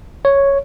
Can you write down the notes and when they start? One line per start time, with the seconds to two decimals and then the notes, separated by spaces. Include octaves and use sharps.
0.25 C#5